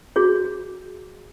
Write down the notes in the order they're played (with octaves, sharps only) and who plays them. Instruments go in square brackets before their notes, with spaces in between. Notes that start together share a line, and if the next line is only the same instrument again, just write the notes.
[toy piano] F#4 G#4 C#5